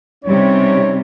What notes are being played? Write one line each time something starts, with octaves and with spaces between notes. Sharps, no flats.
C3 G3 C#4 D#4 C#5